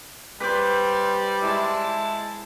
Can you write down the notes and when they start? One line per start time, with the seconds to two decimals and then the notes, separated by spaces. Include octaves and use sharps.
0.40 G3 B4 C5 D5
1.42 G#3 E4 A5